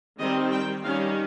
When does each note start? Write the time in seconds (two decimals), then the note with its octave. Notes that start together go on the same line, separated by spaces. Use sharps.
0.19 D#3 G3 C4 D#5
0.52 G5
0.83 D#3 G3 C#4 F5